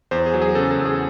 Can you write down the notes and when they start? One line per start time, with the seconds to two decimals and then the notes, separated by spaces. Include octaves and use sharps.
0.11 E2 C5
0.26 G#4
0.34 F#3
0.42 G#4
0.55 C#3 A4
0.71 A4
0.78 E2
0.85 G#4